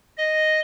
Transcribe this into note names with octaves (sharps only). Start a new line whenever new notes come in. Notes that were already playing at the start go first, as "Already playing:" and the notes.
D#5